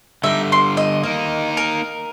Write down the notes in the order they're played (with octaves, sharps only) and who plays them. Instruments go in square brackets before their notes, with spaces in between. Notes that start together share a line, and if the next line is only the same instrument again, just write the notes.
[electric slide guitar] D3 G3 [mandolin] D#4 E5
[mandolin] C6
D#5
[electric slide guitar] A#3 D#4 [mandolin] D#5
[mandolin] A#4